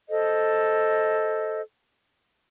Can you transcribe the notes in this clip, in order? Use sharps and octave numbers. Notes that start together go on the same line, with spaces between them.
A4 C5 D#5